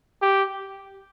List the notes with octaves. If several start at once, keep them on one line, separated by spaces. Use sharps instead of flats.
G4